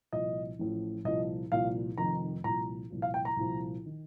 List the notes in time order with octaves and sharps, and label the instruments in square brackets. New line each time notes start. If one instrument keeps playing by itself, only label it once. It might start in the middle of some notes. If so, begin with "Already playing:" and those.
[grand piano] C2 A#2 F3 D#5
A1 A2 F3
C2 A#2 F3 D#5
C2 A#2 F3 F5
F1 F2 D#3 A#5
C2 A#2 F3 A#5
C2 A#2 F3
F5
G5
A#5
C2 A#2 F3
D#3